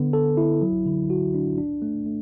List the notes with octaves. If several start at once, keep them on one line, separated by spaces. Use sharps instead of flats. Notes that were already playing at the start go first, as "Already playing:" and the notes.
Already playing: D3 B3
A4
E4
F#3
D3
F#4
D4
D4
A3
A3